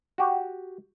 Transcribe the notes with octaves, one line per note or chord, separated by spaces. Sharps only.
F#4 G4